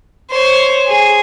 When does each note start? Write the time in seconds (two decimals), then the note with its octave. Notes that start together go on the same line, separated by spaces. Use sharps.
0.30 C5 C#5
0.87 G#4